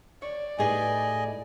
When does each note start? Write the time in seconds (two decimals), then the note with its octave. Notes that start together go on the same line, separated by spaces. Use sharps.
0.22 C#5 D5
0.59 A2 D#4 G4 G#4 B4 D#5 G#5